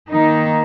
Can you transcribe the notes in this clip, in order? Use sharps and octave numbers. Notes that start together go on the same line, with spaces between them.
D#3 A#3 D#4